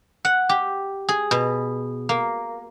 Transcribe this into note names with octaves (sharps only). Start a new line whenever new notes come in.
F#5
G4
G#4
B2
A#3